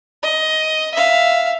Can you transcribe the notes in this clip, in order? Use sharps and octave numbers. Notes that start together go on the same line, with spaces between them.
D#5
E5 F5